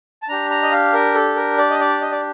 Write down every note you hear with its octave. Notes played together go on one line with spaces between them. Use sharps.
A5
D4 G4 A#5
A#5
D#5
F5
A#4
A4
A#4
D5
D#5
D5
D#5
D5